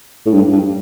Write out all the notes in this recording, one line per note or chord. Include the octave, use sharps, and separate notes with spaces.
A2
G2
G2